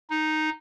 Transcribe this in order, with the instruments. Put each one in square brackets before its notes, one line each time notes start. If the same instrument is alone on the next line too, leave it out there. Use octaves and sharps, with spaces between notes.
[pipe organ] D#4